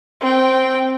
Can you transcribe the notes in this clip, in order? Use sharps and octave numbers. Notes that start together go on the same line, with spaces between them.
C4 G5